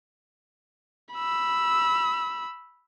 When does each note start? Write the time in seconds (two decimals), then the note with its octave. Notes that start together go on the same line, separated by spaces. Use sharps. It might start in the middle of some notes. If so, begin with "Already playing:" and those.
1.14 B5 E6